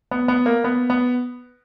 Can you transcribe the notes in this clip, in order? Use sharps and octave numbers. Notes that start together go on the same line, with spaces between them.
B3
B3
A#3
B3
B3